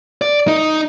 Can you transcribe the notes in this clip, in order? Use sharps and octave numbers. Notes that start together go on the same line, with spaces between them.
D5
D#4